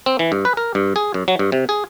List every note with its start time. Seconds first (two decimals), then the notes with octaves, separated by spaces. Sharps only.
0.06 C4
0.19 E3
0.32 G2
0.45 B4
0.57 A#4
0.75 G2
0.96 G#4
1.14 F#2
1.28 F#3
1.39 G2
1.52 C3
1.69 G#4